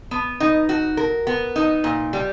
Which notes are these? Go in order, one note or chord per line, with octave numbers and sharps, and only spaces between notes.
B3
D#4
F#4
A#4
B3
D#4
A#2
G3